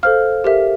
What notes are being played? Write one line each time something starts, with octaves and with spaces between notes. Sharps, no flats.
A4 C5 F5 F6
G4 A#4 E5